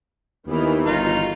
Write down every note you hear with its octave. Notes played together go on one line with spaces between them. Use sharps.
D#2 D#3 E3 B3
G1 D#4 F4 F#4 F5